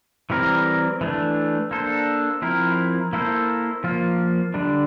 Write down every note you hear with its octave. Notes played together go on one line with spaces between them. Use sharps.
E3 G3 C4 E4 A#4
E3 A3 D4
A#3 D4 A4 C5
F3 C4 E4 A#4
A#3 E4 A4 C5
F3 A#3 F4
D3 G3 D4